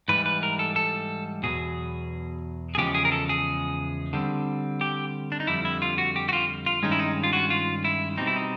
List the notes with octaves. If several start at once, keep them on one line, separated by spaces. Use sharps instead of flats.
G#2 E3 G3 B4
B4
A#4
A4
A4
E2 B2 F#3 G#4
G#4
E2 C#3 F3 G#3 C#4 G4
G#4
A#4
A4
G#4
D3 G3 C4
G4
D4
D#4
F2 D3 G3 E4
E4
F4
F#4
G4
F#4
F4
F4
G2 D#3 G#3 C#4 D#4
E4
D#4
F4
F#4
F4
E4
B2 G3 C4 D#4
E4
D#4